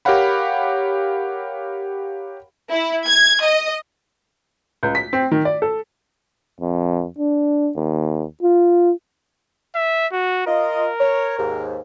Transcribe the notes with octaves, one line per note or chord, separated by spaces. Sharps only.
G4 A#4 C#5 F5 F#5 B5
E4
G#6
D#5
C#2
B6
C4
D#3
D5
A4
F2
D4
D#2
F4
E5
F#4
F4 A#4 D#5
C#5
D#2 G#2